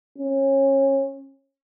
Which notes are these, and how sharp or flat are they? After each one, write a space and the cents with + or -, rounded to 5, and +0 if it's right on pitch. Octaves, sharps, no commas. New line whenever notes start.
C#4 -25